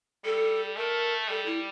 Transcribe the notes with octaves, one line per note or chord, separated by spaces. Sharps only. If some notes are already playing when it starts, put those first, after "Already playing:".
G3 A4
A3 A#4
G3 A4
E4